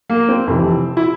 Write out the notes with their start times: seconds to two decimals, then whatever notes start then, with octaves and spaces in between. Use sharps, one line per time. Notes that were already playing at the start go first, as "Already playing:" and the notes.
0.09 A#3
0.29 C4
0.47 F1 F2 C3 E3
0.97 E4